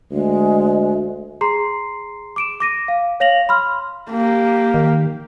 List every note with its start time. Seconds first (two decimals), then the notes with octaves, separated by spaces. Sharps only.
0.11 D2 G#3
1.41 G#4 A#5 C6 C7
2.36 D6 D7 E7
2.60 D6 A#6 D#7
2.88 F5
3.20 C#5 F5 A#6 F7 F#7
3.49 B5 C6 F6
4.11 A#3 G4
4.74 D#3